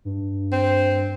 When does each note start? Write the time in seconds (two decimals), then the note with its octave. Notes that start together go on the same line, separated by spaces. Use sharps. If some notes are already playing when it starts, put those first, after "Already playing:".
0.05 G2
0.52 C4